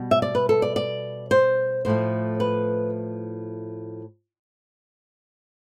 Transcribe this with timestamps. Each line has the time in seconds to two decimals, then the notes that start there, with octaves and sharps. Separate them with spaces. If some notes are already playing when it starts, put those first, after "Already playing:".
Already playing: B2 G3
0.11 E5
0.22 D5
0.35 B4
0.49 A4
0.62 D5
0.76 D5
1.31 C5
1.85 A2 F3 A3 C5
2.40 B4